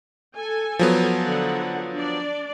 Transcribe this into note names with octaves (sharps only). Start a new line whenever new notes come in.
A4 G#5
F3 F#3 B3
D3 F#5
D4 D5